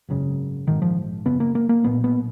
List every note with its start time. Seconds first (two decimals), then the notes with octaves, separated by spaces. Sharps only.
0.09 G#1 F#2 C#3
0.67 A#1 G#2 D#3
0.82 F3
1.25 F#1 F2 C#3 B3
1.40 A#3
1.55 A#3
1.69 A#3
1.84 B1 A#2 B3
2.04 B3